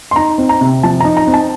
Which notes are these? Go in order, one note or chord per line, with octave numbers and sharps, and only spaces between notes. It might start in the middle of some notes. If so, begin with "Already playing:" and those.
C6
D#4 A#5
C4
A#5
C3
F3 A5
A#5
D#4
A#5
C4
A5